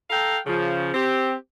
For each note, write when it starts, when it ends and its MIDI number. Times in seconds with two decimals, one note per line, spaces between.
0.10 0.38 69
0.10 0.38 77
0.10 0.38 79
0.10 0.38 82
0.46 0.91 49
0.46 0.91 53
0.94 1.34 60
0.94 1.34 67